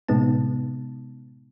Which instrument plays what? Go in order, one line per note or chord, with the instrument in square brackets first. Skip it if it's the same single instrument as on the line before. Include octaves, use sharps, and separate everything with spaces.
[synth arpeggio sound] A2 C3 G#3 B3 D#4 A5